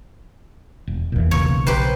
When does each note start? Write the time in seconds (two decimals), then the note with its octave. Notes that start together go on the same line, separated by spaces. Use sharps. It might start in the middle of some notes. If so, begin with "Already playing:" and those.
0.87 E1
1.12 D#1 E2 A#2 E3
1.31 B1 C#3 A#3 C#5
1.67 A#1 G4 B4 C5